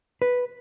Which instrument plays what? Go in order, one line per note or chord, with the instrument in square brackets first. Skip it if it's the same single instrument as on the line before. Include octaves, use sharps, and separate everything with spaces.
[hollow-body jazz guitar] B4